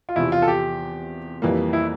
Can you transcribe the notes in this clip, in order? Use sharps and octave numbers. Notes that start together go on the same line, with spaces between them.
F4
E2 C3 F3 E4
F4
A4
G4
F2 E3 G3 A#3
E4